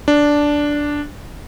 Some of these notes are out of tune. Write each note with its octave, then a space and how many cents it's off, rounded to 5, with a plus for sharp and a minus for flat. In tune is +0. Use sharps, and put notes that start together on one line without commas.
D4 -5